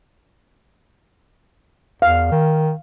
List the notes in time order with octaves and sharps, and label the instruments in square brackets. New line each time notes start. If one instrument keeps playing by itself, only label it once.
[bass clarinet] E2 [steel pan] F5
[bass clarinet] D#3